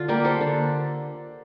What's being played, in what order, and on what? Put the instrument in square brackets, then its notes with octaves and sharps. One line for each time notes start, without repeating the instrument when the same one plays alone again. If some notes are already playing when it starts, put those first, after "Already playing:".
Already playing: [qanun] D3 F4
G3 A#3 G4 A#4
A4 C5
D3